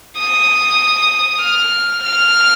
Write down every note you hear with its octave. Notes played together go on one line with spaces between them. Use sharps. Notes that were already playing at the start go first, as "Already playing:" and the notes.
D#6
F6
F6